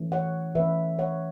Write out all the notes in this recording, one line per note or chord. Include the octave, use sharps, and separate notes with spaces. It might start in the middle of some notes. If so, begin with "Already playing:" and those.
Already playing: E3 A3 C#4
C#5 F#5
E3 A3 C#4 B4 E5
C#5 F#5